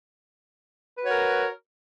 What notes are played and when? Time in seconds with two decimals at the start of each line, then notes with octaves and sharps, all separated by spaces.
0.96 B4
1.01 F#4
1.06 C#5
1.10 A#4